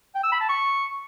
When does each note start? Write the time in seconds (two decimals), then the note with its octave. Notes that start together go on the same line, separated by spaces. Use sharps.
0.15 G5
0.24 E6
0.32 B5
0.41 A5
0.49 C#6